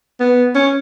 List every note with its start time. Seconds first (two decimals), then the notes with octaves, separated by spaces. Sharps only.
0.20 B3
0.55 C#4